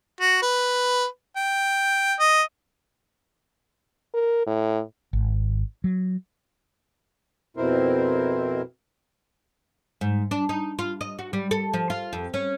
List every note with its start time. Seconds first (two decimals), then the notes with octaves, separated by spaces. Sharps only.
0.20 F#4
0.42 B4
1.36 G5
2.20 D#5
4.14 A#4
4.47 A2
5.13 G#1
5.84 F#3
7.57 F2 B2 C4 E4 A#4 C5
10.01 G#2
10.31 D4
10.49 D#4
10.79 F4
11.01 D#5
11.19 F#4
11.33 G3
11.51 A4
11.73 F3
11.90 F4
12.13 F2
12.34 C#4